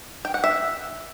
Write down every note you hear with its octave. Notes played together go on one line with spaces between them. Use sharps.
G5
F#5
E5